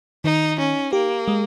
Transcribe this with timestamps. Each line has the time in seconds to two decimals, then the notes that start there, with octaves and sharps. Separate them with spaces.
0.24 D#3 D#4
0.58 C#4 D#4
0.93 A#3 G4
1.28 G#3